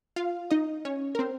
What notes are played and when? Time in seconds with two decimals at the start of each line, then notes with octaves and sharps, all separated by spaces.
0.16 F4 F5
0.51 D#4 D#5
0.85 C#4 C#5
1.15 A#4
1.19 C4 C5